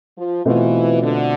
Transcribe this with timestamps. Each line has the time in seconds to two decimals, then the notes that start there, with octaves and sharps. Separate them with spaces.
0.18 F3
0.45 B2 E3 A3 C4 F4
1.03 D3